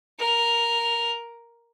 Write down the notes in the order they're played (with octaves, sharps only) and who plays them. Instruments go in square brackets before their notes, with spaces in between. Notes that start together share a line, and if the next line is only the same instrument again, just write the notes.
[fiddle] A#4